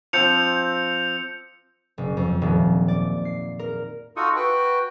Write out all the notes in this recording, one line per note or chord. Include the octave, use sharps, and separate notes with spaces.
F3 C4 G6 C#7 F7
F#1
F2
D#1
D5
C7
A#4
D#4 F4 F#4 A4 C#6 D#6
F#4 B4 G5